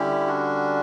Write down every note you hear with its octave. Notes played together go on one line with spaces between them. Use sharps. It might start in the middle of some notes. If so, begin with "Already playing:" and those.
Already playing: D3 G3 C#4 E4 G4
D4 F#4